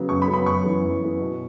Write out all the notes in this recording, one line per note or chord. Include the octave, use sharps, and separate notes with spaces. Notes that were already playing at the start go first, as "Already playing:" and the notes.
Already playing: C#3 F#3 B3
F#2 C#6
B5
C#3 F#3 B3
B5
F#2 C#6
E3 B3
F#2
E3 B3
B2